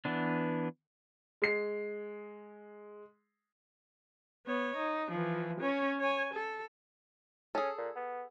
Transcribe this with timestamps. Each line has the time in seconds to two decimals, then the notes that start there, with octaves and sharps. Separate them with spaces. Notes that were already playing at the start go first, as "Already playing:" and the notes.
0.05 E3 B3 D4
1.42 G#3 C7
4.46 B3 C#5
4.76 D#4
5.11 E3 F3
5.61 C#4 C#5
5.99 C#5 G#5
6.34 A4
7.55 C#4 G#4 A4
7.78 A#2
7.95 B3